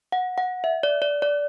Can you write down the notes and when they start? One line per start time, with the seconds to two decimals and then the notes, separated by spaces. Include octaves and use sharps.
0.12 F#5
0.38 F#5
0.64 E5
0.83 D5
1.02 D5
1.22 D5